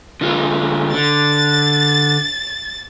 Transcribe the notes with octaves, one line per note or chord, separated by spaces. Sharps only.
D3 F4 G#4
D3 A6